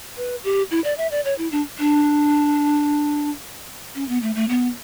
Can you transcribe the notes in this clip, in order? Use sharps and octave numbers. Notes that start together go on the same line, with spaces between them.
B4
G4
E4
D5
E5
D5
C#5
E4
D4
D4
C#4
B3
A3
A3
B3